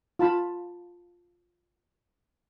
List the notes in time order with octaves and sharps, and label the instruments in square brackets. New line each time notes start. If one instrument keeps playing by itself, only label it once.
[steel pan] F4 A5 B5